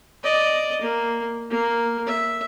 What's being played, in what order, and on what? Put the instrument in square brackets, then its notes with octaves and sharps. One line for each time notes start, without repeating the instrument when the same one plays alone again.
[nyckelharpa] D5 D#5
A#3
A#3
E5